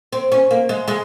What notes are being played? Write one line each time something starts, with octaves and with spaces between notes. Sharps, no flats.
C4
C#4
A#3
G#3
G#3